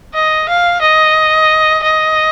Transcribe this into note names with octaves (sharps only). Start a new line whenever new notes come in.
D#5
F5
D#5
D#5